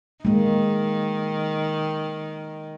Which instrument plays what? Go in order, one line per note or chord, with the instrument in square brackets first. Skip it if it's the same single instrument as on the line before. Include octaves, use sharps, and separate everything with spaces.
[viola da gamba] D#3 [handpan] G#3 A#3